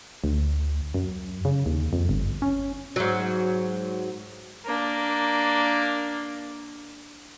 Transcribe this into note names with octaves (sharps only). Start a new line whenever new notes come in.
D2
F#2
C#3
D#2
F2
G1
C#4
G#2 F#3
A#3 D4